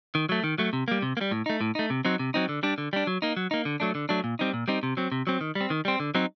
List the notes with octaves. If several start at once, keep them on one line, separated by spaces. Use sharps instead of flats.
D#3
F#3 A3
D#3
F#3 A3
C3
G3 A#3
C3
A#3
G3
A2
A3 D#4
A2
A3 D#4
C3
F#3 C4 D#4
C3
F#3 C4 D#4
D3
G3 D4
D3
G3 D4
F#3
A#3 D#4
F#3
A#3 D#4
D3
F#3 A3 D4
D3
F#3 A3 D4
A#2
G3 C4 D#4
A#2
G3 C4 D#4
C3
F#3 C4
C3
F#3 C4
D#3
G3
C4
D#3
G3 C4
D3
F#3 C4 D#4